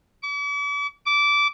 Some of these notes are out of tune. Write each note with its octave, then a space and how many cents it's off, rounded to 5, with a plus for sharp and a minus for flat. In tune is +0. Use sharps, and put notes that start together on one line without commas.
D6 -45
D6 -20